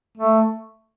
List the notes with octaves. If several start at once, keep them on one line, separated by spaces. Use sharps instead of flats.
A3